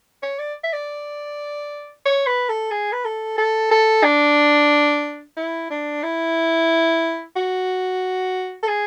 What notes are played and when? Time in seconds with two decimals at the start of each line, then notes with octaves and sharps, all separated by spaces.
0.23 C#5
0.39 D5
0.63 E5
0.73 D5
2.05 C#5
2.26 B4
2.49 A4
2.71 G#4
2.92 B4
3.05 A4
3.38 A4
3.71 A4
4.03 D4
5.37 E4
5.70 D4
6.03 E4
7.36 F#4
8.63 A4
8.68 G#4